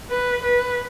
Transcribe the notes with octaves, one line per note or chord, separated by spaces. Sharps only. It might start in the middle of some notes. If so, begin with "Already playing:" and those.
B4
B4